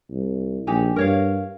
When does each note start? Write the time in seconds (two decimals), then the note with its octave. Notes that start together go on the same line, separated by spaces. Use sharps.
0.11 C2
0.67 A#1 D#4 G4 G#5
0.96 G2 A#4 C#5 F5